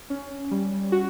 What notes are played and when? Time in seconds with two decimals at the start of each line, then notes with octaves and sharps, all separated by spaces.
0.10 C#4
0.51 G3
0.92 F#4